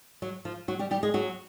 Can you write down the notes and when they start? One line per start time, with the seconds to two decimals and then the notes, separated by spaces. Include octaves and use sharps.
0.22 F#3 F#4
0.45 F3 F4
0.68 F#3 F#4
0.79 G3 G4
0.91 G3 G4
1.03 G#3 G#4
1.14 F#3 F#4